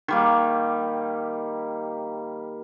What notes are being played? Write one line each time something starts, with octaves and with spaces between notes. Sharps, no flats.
D#3 G3 A#3